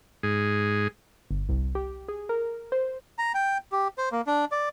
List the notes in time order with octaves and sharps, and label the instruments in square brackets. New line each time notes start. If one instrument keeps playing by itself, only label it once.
[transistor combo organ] G#2 G#4
[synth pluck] G1
C2
G4
G#4
A#4
C5
[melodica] A#5
G5
G4
C5
A#3
D4
D5